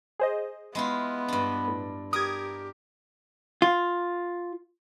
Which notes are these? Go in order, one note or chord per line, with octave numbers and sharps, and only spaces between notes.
G#4 C5 D#5
G#3 B3 E4 F4
G2 D4
A2
G4 A#4 D#6 G#6
F4